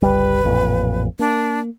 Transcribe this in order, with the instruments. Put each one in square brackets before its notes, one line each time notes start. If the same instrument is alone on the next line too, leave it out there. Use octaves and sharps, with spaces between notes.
[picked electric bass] G1 C#2 G3 [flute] B4
[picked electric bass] A1 F2 A#2
[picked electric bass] A#3 [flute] D4